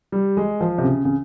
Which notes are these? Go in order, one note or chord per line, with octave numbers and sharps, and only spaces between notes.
G3
G#3
F3
C3
C#3
C#3